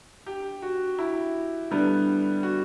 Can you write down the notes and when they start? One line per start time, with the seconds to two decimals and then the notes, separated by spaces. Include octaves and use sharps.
0.27 G4
0.62 F#4
0.99 E4
1.71 D3 G3 B3
2.43 F#4